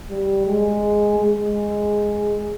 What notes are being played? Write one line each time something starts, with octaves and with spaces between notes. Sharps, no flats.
G3
G#3
G#3